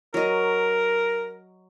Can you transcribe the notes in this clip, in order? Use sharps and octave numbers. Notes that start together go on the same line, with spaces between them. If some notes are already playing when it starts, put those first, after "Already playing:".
F#3 A#4 D#5